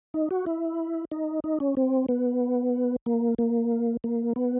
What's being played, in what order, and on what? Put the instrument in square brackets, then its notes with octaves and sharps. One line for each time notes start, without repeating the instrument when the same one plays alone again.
[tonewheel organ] D#4
F#4
E4
D#4
D#4
C#4
C4
B3
A#3
A#3
A#3
B3